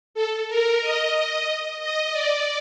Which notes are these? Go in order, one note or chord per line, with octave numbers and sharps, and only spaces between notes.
A4
A#4
D#5
D#5
D5